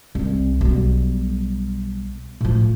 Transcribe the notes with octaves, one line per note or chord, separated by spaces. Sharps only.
C2
B1 G3
A2 F3